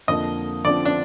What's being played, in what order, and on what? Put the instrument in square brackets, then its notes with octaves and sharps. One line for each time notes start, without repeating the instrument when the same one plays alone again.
[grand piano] F2 D3 F3 A#3 [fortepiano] D#5
[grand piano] D3 F3 C4 [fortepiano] D5
[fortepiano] D4